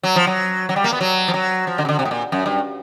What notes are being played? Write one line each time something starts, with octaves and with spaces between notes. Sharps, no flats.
F#3
F3
F#3
F#3
G3
A#3
B3
F#3
F3
F#3
F3
D3
C#3
D3
C3
A2
A#2
F#2
G2